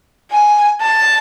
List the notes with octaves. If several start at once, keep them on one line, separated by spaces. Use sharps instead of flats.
G#5
A5